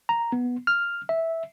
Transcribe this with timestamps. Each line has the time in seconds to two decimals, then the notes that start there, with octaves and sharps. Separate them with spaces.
0.09 A#5
0.32 B3
0.67 F6
1.09 E5